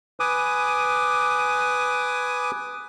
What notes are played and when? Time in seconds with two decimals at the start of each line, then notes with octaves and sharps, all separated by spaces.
0.20 B4 G#5 D6 D#6